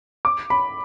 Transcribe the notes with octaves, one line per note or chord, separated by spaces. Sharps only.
D6
B5